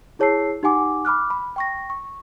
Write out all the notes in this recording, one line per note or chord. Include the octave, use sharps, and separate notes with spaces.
E4 G#4 C#5 A5 E6 C7
D#4 G4 F#5 G#5 D6
B5 D6 F6 F#6
B5
G5 C#6 A#6
C#6